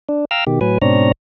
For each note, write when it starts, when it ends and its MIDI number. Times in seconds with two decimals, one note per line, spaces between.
0.09 0.25 62
0.31 0.44 77
0.31 0.44 79
0.31 0.44 82
0.31 0.44 88
0.31 0.44 89
0.47 0.59 47
0.47 0.59 51
0.47 0.59 67
0.61 0.78 45
0.61 0.78 54
0.61 0.78 71
0.61 0.78 80
0.82 1.12 44
0.82 1.12 47
0.82 1.12 60
0.82 1.12 62
0.82 1.12 73
0.82 1.12 82